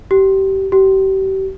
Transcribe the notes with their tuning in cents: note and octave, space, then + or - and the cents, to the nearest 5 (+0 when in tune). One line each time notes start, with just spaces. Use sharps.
G4 -25
G4 -35